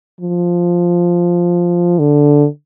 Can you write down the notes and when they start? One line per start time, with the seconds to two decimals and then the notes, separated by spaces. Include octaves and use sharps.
0.21 F3
1.99 D3